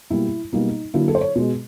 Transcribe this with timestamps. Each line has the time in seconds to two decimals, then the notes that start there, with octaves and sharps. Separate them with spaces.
0.10 B2 G3 A#3 E4
0.53 B2 G3 A#3 D#4
0.94 D3 F#3 A#3 E4
1.08 A4
1.15 C5
1.21 C#5
1.36 B2 G#3